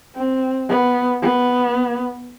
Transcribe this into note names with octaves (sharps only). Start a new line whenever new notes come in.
C4
B3
B3